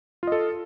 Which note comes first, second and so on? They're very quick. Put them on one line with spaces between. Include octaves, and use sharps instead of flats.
F4 D#5 A4